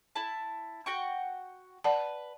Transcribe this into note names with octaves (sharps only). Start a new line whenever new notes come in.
E4 A5
F#4 G5 C#6
B4 D5 F#5 A5